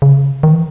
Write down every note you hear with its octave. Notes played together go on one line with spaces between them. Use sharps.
C#3
D#3
E3